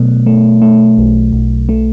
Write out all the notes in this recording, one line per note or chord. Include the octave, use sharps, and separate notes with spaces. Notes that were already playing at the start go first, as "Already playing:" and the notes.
Already playing: B2 F#3 A3
A3
A3
B1
B1
A3